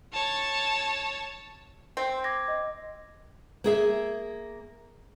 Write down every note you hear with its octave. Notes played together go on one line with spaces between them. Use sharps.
C#5 A5
C4
D6 G#6 A#6
D#5
A#3 G#4 E5